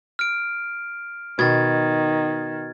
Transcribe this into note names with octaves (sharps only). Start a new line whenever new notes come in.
F6 D7
B2 D#3 G#6 A6